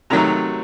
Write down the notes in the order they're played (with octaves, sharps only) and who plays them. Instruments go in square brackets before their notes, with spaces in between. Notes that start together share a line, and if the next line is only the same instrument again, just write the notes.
[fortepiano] C3 D#3 F#3 A3 A#5